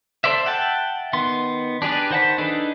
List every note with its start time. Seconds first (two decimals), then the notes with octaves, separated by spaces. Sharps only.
0.24 A4 C5 D5 E5
0.45 E5 F#5 G5 A5
1.13 D#3 B3 C6
1.82 D4 G4 G#4 B4 D5
2.10 D#3 C5 F#5 A5 B5
2.38 D4 D#4 G#4 A4 B4